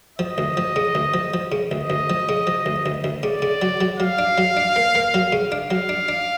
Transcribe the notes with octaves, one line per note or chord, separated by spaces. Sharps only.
F3 D#5
D2
F3
C#3
D2
F3
F3
C#3
D2 D#5
D2
F3
C#3
F3
D2
D2
D2
C#3 D5
C#3
F#3
F#3
F#3 F5
D4
F#3
D4
A#3
A#3
F#3
C#3
D4 F5
F#3
D4
D4